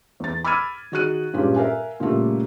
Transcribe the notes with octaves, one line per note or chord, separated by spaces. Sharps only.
E2 A6
B5 D6 E6 F6 G#6 D#7
D#3 D#4 F#4 G#4 F#6 D#7
G2 A#2 G#3 C#4 G4
A#4 E5 F5 G#5
A#2 C#3 G3 A3 A#3